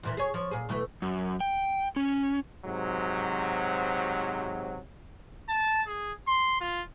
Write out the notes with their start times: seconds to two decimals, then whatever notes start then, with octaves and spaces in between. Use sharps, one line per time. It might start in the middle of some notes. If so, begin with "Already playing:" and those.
0.03 E2 A#2 E3
0.17 G#4 C#5
0.34 F3 C#5
0.51 A#2 G#4
0.69 B2 E3 A3
1.02 F#2
1.41 G5
1.96 C#4
2.64 G#2 C3 F#3
5.49 A5
5.87 G#4
6.28 C6
6.61 F4